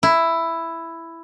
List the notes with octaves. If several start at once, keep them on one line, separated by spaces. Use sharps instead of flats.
E4